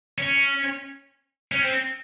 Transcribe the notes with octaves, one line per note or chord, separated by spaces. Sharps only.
C#4
C#4
C4